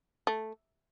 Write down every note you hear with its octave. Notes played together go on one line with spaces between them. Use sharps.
A3